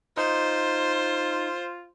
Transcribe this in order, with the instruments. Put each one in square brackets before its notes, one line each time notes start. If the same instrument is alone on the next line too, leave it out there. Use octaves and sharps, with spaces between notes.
[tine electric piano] D#4 [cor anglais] F4 [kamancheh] C5